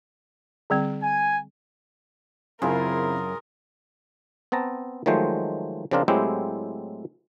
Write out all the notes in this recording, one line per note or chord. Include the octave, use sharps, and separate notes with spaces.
D3 G3 C4
G#5
F#2 C#3 C4 E4 F4 G#4 A#4
B3 C4 A5 A#5
D#3 F3 F#3 G#3 A3 C5
C#3 F3 C4 D4 F4 A#4
A2 F#3 G#3 C4 E4 G4